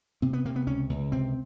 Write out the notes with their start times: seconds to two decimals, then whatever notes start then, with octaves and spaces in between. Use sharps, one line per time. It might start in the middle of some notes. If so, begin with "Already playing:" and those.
0.22 C3 C4
0.33 B3
0.45 C3 A#3
0.56 B3
0.67 C#2 C#4
0.89 C#2
1.12 C3 C4